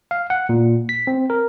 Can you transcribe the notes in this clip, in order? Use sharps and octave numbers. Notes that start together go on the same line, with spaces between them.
F5
F#5
A#2
B6
C4
A#4